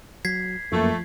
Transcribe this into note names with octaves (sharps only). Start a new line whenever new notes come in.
F#3 G#6 B6 C7
F#2 F3 A3 A#3